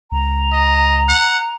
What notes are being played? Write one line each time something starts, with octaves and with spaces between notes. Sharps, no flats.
C#2 A#5
D#5
F#5